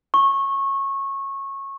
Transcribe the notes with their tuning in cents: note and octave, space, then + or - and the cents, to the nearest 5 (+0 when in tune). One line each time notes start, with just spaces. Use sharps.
C#6 -20